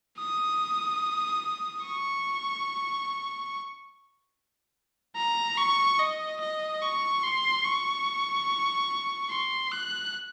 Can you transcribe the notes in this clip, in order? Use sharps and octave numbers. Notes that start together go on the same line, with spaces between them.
D#6
C#6
A#5
C#6
D#5
D#5
C#6
C6
C#6
C6
F#6